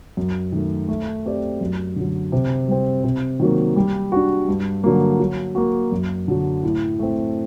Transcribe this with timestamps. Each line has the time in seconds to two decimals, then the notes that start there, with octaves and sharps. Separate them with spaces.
0.17 F#2
0.52 D#3 A3
0.88 A3
1.25 C4 G4 D5
1.61 F#2
1.96 D3 F#3
2.32 C3
2.68 G3 C4
3.04 C3
3.40 D#3 F#3 A#3
3.76 G3
4.12 D4 F#4
4.48 G2
4.84 D3 F#3 A#3
5.20 F#3
5.55 A#3 F#4
5.92 F#2
6.28 D3 F#3
6.63 A2
6.99 A3 C4